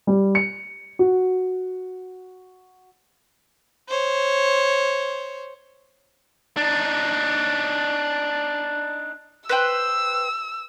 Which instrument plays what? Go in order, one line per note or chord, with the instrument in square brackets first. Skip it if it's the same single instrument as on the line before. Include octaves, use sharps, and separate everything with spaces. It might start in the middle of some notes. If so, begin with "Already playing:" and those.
[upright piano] G3
C#7
F#4
[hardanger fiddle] C5 C#5
[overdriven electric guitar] D4 D#4
[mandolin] B4 C5 G5 [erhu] E6